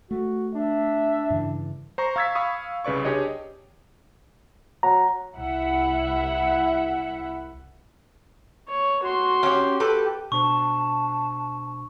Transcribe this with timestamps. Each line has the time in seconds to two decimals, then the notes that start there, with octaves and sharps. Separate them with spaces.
0.11 A3 F#4
0.55 D4 E5
1.30 G2 C#3 E3
1.98 C5 A#5 C#6
2.16 F5 C#6 E6 G#6 A6 B6
2.35 F5 B5 C#6 D#6
2.84 C2 C#3 B4 D5 C#6
3.05 D4 G4 G#4 C#5 D#5
4.83 F#3 A#5
5.37 C2 E4 E5 F#5
8.69 C#5
9.03 F#4 C6
9.43 C#4 G4
9.80 G4 A4 B4
10.32 B2 D4 C5 A5 C#6